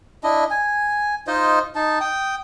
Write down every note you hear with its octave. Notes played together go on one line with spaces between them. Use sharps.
D4 E4 D#5
G#5
D#4 F4 C5 D#5
D#4 A5
G5 D#6